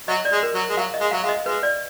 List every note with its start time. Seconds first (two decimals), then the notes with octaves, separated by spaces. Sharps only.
0.08 F#3 D#5
0.25 D5
0.32 G#3
0.43 A#4
0.55 F#3
0.69 G#3
0.77 F#3 F5
0.94 D#5
1.00 G#3
1.11 F#3 F5
1.24 G#3 F5
1.29 D#5
1.46 G#3 B4
1.63 D5